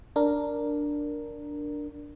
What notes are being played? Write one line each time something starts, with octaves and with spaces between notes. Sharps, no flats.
D4 A#4